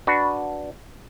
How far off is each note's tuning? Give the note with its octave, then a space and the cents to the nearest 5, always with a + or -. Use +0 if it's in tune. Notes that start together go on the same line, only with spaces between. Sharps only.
D4 +0 F#4 +0 B4 +0